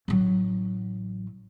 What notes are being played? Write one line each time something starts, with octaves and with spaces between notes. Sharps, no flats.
A1 F#3